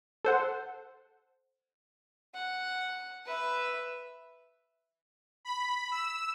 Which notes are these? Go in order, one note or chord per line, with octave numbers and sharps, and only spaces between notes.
A4 C5 F#5
F#5
B4 E5
B5
E6